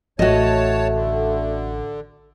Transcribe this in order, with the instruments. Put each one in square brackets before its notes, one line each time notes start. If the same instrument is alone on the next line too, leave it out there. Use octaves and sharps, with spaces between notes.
[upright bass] A1 [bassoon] A3 [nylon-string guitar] F#4 D#5 [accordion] C#5 A5
[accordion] D3